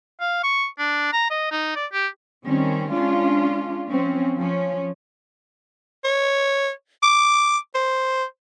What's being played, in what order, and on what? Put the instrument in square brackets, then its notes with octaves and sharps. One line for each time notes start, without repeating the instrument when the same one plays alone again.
[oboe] F5
C#6
D4
A#5
D#5
D#4
D5
G4
[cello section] D#3 G3 C4 C#4
G#3 C#4 D4 F4
F3 C4 C#4
F3 C#4
[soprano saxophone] C#5
D6
C5